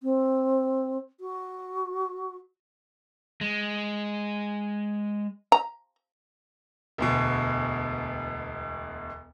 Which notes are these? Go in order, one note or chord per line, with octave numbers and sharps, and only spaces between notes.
C4
F#4
G#3
A#5
E1 D2 B2